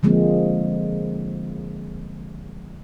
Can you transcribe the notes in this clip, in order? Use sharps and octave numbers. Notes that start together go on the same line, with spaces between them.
D3 F3 G#3 A#3 C4